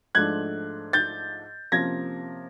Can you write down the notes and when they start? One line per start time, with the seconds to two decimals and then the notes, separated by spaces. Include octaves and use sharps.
0.15 G#2 F3 A3 D4 F#6 G#6
0.93 G6 A6
1.72 C3 F3 A#3 C#4 G#6 A#6